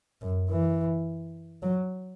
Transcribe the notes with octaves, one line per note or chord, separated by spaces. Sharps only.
F#2
E3
F#3